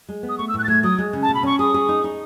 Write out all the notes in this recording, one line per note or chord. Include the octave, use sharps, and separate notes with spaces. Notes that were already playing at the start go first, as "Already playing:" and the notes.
G#3
B3
D#6
A3 C#6
E6
A2 F#6
A6
A3 G#6
F#3 D#6
G#3
C#3
A5
B2
B5
C#4 C#6
G#4 D#6
G#4
D#4
D#4